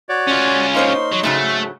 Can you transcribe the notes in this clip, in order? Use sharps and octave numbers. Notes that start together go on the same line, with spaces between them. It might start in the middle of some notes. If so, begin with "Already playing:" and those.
F#4 C#5 D5
C#4 F4
A#3 D#4 C5 C#5 C6
F#3
G#2 C#3 F#3 A3